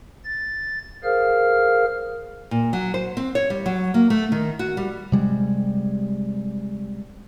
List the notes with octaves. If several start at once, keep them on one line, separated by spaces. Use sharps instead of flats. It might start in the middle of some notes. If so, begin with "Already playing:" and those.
A6
G#4 A#4 C5 F5 F6
A#2
F#3
C5
C4
C#5
G3
F#3
A#3
A3
D#3
F#4
G3
C3 G3 G#3